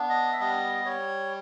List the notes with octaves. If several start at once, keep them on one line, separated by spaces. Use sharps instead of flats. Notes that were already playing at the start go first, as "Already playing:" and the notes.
Already playing: B3 D4
D#5
E5
G3 D#5
G3 C#5